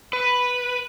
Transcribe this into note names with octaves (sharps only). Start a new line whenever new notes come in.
B4